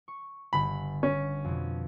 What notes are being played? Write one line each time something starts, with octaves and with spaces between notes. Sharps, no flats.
C#6
G1 D3 B5
C#4
F2 B2